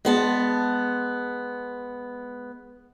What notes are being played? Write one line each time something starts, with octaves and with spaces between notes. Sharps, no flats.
G#3 B3 A5